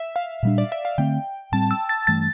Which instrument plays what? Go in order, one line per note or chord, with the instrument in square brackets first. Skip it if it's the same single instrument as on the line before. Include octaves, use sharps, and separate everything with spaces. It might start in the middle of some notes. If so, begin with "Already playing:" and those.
Already playing: [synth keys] E5
F5
[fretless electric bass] A#2 G3 D4
[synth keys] D5
E5
F5
[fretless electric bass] D3 A3 C4 [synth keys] G5
[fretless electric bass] A2 G3 C4 [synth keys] A5
[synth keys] E6
A6
[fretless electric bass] G2 E3 A3 [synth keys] A6